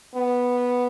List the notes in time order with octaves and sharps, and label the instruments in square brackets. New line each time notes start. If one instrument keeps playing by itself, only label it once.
[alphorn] B3